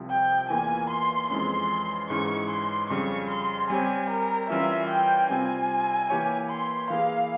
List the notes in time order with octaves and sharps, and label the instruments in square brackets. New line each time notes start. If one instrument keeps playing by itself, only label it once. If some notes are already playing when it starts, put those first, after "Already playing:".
Already playing: [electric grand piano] C2 C3 F3 C4
[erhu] G5
[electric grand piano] E2 E3 A#3 F4 A#4 [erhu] G#5
[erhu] C6
[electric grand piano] F2 E3 G#3 C#4 [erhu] C6
[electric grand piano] G#2 E3 G#3 C#4 E4 [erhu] C#6
[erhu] C6
[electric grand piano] F2 C#3 G3 [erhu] C#6
[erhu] C6
[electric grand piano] G3 C4 G4 C#5 [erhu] G#5
[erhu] A#4
[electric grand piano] E3 G3 C#4 F4 A#4 [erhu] E5
[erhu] G5
[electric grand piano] C3 G3 C4 F4 [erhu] G#5
[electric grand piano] E3 A#3 E4 G4 C#5
[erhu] C6
[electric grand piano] E3 A#3 E4 G#4 [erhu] F5